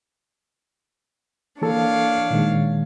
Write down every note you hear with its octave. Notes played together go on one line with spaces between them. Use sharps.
E3 A#3 D4 A4 C#5 F5
A#2 D#3 G#3